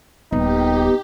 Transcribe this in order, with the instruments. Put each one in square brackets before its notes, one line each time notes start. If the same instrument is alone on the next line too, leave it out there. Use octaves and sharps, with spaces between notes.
[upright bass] D#1 [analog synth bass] B3 [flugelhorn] D#4 [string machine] G4